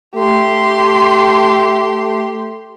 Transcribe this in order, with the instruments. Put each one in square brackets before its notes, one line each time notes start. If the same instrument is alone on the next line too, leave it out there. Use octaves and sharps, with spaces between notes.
[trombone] A3 [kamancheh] G4 C6